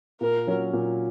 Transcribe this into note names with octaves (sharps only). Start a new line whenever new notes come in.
A#2 A#4
F#3 C#4
A#2